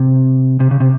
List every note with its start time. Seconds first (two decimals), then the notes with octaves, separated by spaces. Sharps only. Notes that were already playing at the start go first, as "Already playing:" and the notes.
Already playing: C3
0.60 C3
0.71 C#3
0.80 C3